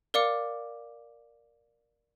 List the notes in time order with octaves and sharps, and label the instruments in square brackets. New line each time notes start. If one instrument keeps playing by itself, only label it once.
[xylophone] A#4 D5 F5 D6 C#7